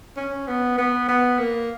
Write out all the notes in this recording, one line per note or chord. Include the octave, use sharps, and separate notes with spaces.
C#4
B3
B3
B3
A#3